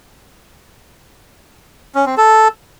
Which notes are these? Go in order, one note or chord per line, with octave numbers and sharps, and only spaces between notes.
C#4
C4
A4